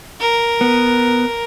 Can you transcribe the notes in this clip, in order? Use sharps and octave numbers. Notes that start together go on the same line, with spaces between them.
A#4
B3